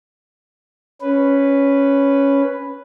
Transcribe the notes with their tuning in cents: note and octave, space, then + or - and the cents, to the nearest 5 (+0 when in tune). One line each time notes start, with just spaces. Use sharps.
C#4 +0 B4 +0